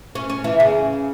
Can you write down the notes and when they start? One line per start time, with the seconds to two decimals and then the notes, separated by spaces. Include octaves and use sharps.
0.15 C#4
0.30 C#4
0.44 E3
0.60 C#3